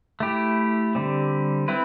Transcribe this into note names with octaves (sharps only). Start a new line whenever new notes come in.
A3 E4 G4
D3 G3 C4
C4 E4 B4